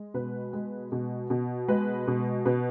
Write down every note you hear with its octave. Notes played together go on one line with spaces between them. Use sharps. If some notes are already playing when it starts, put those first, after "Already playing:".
Already playing: G#3
B2 B4
G#3
B2
B2
G#3 B4
B2
B2 B4